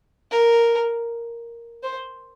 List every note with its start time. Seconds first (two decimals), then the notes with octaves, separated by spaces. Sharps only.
0.31 A#4
1.83 C5